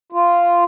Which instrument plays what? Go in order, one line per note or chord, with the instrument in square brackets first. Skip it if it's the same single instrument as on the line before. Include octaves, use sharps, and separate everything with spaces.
[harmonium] F4